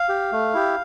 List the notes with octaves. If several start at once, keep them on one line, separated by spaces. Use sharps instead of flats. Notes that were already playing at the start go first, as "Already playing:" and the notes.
Already playing: F5
G4
A3
E4 G4